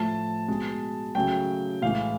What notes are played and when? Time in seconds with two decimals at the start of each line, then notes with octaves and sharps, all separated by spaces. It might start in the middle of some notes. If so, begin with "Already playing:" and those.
Already playing: A2 F3 A3 A5
0.48 B2 G#3
1.15 C#3 F#3 A3 G5
1.82 A2 E3 G#3 F5